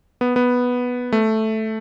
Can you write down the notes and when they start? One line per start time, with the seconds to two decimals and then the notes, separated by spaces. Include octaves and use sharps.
0.21 B3
0.36 B3
1.12 A3